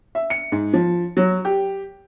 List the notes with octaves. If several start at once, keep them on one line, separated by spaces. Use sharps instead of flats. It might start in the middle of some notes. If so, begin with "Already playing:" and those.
E5
C#7
G#2
F3
F#3
G4